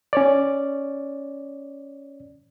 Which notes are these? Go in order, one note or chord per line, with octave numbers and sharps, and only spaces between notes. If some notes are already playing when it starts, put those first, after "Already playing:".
C#4 C#5 D5